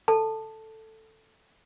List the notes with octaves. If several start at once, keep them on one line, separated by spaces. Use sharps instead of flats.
A4 A5